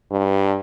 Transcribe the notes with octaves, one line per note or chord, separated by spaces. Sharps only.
G2